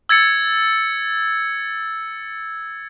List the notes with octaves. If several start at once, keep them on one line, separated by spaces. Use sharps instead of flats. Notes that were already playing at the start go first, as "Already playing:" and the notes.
E6 G#6 A6 C#7